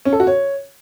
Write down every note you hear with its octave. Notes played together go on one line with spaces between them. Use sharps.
C#4
A4
F#4
C#5